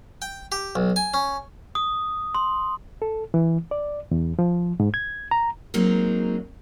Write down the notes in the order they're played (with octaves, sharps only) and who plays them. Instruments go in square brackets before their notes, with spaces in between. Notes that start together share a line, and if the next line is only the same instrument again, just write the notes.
[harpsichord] G5
G4
B1
G#5
C#4
[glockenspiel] D#6
C6
[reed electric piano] A4
E3
D5
E2
F3
G#2
G#6
A#5
[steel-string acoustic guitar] F#3 G#3 A#3 C4 D#4